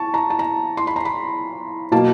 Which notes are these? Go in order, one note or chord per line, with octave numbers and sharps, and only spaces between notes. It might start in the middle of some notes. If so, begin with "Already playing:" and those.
Already playing: A5 C#6
A#5
A5
A#5
C6
B5
A#5
B5
B2 F#3 A#3 A5